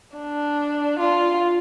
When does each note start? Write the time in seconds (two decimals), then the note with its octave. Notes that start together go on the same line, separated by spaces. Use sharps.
0.17 D4
1.00 F4